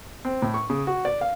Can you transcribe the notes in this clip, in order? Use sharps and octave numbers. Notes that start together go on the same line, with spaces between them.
C4
A2
C#6
C#3
F#4
D5
F5